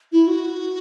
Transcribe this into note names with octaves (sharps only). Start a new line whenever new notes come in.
E4
F#4